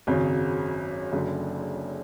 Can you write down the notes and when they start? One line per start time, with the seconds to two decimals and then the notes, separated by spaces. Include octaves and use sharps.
0.07 G#1 F#2 C#3 F#3
1.12 F#1 F#2 D3